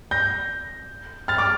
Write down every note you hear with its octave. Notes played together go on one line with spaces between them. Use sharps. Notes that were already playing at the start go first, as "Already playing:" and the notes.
G6 A#6
F6 A6
D6 F6